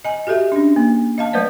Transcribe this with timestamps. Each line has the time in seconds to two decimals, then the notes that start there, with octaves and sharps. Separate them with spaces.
0.04 D#5 G#5
0.27 F#4 G4 A4 E5
0.52 C#4 D4
0.76 A#3
1.18 D#5 F5 A5
1.33 F#3 A3 B4 C5 D5